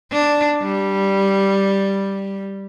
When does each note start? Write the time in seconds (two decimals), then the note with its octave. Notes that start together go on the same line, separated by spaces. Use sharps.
0.12 D4
0.63 G3